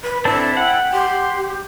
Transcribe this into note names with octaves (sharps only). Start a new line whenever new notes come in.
B4
C4 D4 E4 A4
F#5 G5
G4 C6